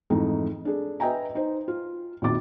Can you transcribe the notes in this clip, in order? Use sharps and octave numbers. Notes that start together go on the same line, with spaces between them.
F2 G#2 E3 A3 D#4
D4 G#4 A4
B4 D#5 E5 G5 G#5 A#5
D#4 C5
F4
A#1 F2 D#3 F#4 D6 A6